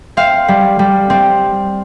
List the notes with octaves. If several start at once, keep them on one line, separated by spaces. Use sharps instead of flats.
C4 F5
G3
G3
C4